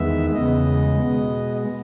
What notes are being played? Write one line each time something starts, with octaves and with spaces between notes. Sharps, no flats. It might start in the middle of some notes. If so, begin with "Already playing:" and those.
Already playing: E2 D#3 G#3 B3 E5
E2 C#3 G#3 B3 D#5
B2 G#3 B3